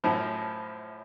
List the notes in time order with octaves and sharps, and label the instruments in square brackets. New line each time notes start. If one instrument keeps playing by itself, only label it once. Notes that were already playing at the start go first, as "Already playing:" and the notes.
[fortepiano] F#2 A2 F3